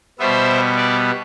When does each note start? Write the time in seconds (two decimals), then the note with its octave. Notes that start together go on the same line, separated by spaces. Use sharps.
0.19 B2 G3 B3 C5 E5
0.77 B4 D5